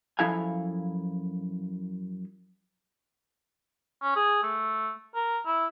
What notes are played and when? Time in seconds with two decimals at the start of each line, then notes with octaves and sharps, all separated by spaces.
0.19 F#2 F3 E4 A4 F5 G#5
4.02 C#4
4.16 G#4
4.43 A3
5.15 A#4
5.46 E4